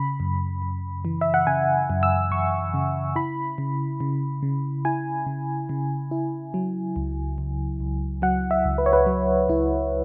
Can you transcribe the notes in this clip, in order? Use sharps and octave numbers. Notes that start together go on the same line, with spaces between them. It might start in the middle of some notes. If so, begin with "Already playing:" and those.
Already playing: C#3 B5
F#2
F#2
E3
E5
F#5
C#3 G#5
F#2
E6
F#2 C#6
C#3
E4 B5
C#3
C#3
C#3
E4 G#5
C#3
C#3
E4
F#3
C#2
C#2
C#2
F#3 F#5
E5
C#2
B4
C#5
B4
F#3
C#2 E4